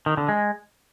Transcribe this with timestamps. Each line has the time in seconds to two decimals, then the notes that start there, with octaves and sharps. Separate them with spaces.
0.06 D#3
0.17 D3
0.29 G#3